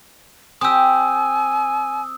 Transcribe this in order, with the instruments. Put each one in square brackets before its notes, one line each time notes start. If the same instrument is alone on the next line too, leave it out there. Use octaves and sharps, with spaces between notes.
[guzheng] C4 G4 [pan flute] G#5 [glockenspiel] D#6 E6